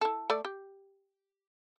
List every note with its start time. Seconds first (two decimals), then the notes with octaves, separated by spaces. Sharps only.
0.01 E4 A4
0.30 A3 D5
0.45 G4